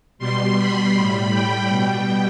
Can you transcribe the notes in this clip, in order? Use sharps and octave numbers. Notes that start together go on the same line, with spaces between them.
B2 G3 C6
B5
A2 G3
G5
B2 G3